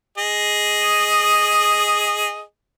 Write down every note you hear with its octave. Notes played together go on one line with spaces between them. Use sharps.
G#4 D#5